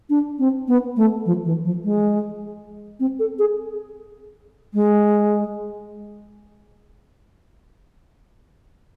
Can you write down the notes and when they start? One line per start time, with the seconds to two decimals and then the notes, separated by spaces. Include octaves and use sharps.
0.10 D4
0.39 C4
0.68 B3
0.97 A3
1.26 F3
1.45 E3
1.65 F3
1.84 G#3
3.00 C4
3.19 A4
3.39 G#4
4.74 G#3